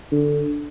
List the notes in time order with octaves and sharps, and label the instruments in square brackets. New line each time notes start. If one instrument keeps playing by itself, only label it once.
[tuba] D3